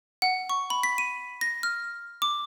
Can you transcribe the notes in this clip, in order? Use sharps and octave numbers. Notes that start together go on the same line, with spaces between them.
F#5
C#6
B5
B6
D#7
A#6
F6
D6